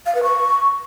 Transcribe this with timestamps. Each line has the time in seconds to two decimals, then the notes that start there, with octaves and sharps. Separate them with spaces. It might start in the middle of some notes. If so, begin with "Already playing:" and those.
0.06 F5
0.15 B4
0.23 C#6